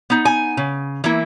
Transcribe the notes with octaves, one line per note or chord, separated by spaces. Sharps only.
B3 D#4
G#5
C#3
E3 A#3 E4